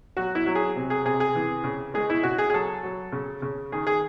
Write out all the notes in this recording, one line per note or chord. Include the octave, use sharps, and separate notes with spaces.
F#3 F#4
E4
F#3
G#4
C3
G#4
C3 G#4
G#4
E3
C#3
G#3 G#4
E4
C#3 F#4
G#4
G#4
F#3 A4
F#3
C#3
C#3
D#3 G#4
G#4